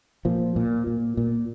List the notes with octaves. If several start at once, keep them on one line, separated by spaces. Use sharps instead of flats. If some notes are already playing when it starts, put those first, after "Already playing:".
A#2 F3
A#2
A#2
A#2